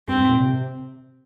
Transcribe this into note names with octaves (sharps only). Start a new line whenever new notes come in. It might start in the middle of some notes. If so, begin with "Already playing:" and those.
G2 C4
G#2
A#2
C3